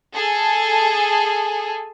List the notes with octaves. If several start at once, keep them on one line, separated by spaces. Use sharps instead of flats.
G#4 A4 G#5